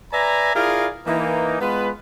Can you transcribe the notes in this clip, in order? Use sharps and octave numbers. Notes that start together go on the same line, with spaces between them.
B4 D5 E5 G#5 A#5
E4 F4 G#4 A#4 D5 F5
E3 A#3 D#4
G#3 B3 F4 B4